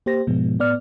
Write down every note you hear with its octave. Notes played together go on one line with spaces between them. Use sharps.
A#3 G4 C5 A#6
G#2 B2 F3 G#3 B3
A2 B3 D5 F6